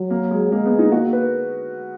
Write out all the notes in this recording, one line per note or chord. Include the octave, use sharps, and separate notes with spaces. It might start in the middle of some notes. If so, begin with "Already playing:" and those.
Already playing: F#3
A#3
G#3
G#3 A#3
B3
D#4
A#3 F#4
B4